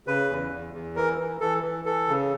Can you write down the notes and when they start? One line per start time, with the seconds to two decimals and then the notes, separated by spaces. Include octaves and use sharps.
0.07 C#3 B4
0.29 E2
0.52 E2
0.73 E2
0.96 E3 A#4
1.18 E3
1.40 E3 A4
1.63 E3
1.85 E3 A4
2.08 C#3